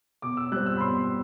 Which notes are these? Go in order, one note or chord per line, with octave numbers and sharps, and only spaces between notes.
B2 D6
E6
G3 C4 F#6
E6
B5
B2 C6